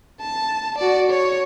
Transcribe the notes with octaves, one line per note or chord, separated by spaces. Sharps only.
A5
F#4 D5
C#5